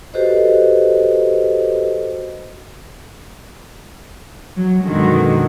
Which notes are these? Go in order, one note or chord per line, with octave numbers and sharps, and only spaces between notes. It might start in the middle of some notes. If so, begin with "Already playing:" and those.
F#4 G4 A4 B4 C5 D#5
F#3
F#2 B2 D3 D#3 G#3 F#4